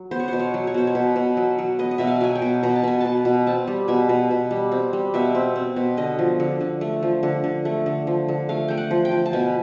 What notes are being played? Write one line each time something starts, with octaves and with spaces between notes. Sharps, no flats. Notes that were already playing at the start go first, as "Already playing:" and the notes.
Already playing: F#3
B3 C5
C#5
B2 C5
C#5
F#3
C#5
B2 C5
C#5
B2
B2
F#3
F#3
B3 D#5
D#5
B2 E5
F5
F#3 G#5
G5
B2
B2 A#5
A5
B2 G#5
B2 A5
B2
C4 A5
G3
B2 G#5
B2
B2
G3
C4
G3
B2 E5
C4
C4
B2
D3 D#5
F3
D3
D3
A3
F3
D3
D3
A3
D3
F3
D3
A3 F5
A3 G5
F#5
F3
G5
F3
A5
B2 G#5